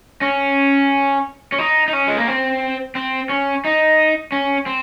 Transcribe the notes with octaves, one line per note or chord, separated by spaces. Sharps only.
C#4
C#4
D#4
D#4
C#4
G#3
A#3
C4
C4
C#4
D#4
C#4
C4